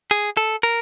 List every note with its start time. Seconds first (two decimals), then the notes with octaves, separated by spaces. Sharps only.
0.11 G#4
0.37 A4
0.63 A#4